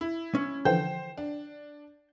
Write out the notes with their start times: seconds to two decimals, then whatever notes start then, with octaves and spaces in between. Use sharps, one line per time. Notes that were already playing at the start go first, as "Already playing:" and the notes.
0.01 E4
0.35 C#4
0.65 D3 E3 F3 C5 G5
1.18 D4